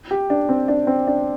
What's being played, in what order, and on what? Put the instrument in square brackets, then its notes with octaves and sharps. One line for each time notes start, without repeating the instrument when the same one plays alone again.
[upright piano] G4
D4
C4
D4
C4
D4